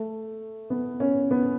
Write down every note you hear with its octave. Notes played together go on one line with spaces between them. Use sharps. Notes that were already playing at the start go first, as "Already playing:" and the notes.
Already playing: A3
B3
C#4
B3